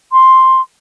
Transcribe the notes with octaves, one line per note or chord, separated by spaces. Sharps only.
C6